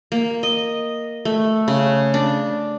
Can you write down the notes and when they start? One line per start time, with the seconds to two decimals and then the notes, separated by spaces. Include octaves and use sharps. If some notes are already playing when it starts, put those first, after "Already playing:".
0.12 A#3
0.43 D#5
1.25 A3
1.68 C#3
2.14 D4